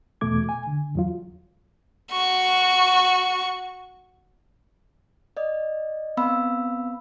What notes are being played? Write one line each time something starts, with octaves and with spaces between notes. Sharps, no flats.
E2 B2 A3 D6 G#6
G#5
D3
E2 F#3 F4
F#4 C#6
D5 D#5
B3 C4 F5 B5 E6